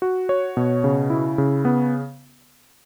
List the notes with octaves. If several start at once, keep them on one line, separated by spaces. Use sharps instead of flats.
F#4
C#5
B2
C#3
E4
C#3
B3